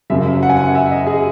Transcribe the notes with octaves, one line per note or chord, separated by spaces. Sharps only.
F#1 F#2 C#3 F#3 E5
F#5
G#5
F#5
E5
D#5
G#4